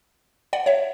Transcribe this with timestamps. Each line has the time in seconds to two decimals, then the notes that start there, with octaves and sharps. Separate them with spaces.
0.53 D5 F#5
0.66 C#5 E5